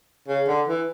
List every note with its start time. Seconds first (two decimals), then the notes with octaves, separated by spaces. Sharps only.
0.28 C#3
0.48 D3
0.68 E3